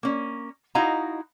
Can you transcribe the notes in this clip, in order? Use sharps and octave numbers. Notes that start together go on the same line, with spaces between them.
A#3 C#4
D#4 E4 F#4 D#5 F5 A#5